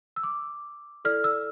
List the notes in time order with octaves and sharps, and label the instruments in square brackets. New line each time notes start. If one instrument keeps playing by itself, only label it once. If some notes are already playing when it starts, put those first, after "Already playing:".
[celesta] E6
D6
E4 A4 D5 F6
E6